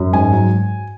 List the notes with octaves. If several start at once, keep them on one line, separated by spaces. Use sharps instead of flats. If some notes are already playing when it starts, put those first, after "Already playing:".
Already playing: F#2
G#2 G#5
F#3